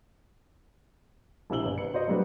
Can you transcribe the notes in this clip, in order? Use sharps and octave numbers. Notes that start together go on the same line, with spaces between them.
A#1 C3 E4 E6 F#7 G7
G1
B4 C#7
F#4 C5 D5 D#5
F#3 G3 A3 D4 B4 C5